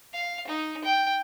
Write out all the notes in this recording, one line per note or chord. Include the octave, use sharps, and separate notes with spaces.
F5
D#4
G5